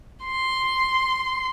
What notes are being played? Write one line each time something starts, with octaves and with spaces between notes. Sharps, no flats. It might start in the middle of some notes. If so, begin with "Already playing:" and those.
C6